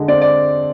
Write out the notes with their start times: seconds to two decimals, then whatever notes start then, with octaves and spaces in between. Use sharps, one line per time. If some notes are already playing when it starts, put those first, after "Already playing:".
Already playing: D3 G#3
0.08 C4 D5
0.22 D5